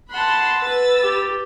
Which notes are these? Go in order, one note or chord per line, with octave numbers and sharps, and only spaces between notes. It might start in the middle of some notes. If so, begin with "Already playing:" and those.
F#5 A5 B5 C6
B4 E6 A6
G4